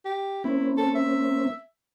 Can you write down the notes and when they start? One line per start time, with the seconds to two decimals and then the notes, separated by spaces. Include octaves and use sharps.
0.05 G4
0.44 A#3 C4 C#4 E4
0.77 A4
0.95 E5